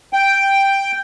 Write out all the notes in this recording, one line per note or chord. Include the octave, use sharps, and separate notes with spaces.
G5